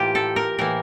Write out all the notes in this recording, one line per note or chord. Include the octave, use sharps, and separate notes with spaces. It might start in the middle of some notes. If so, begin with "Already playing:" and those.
Already playing: A2 E3 A#3 F4 G4
A4
A#4
A2 E3 A#3 A#4